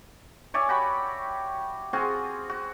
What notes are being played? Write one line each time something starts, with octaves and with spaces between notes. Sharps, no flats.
C#5 D5 E5 G#5
F#4 G4 B5
C4 F4 F#4 G#4
F#4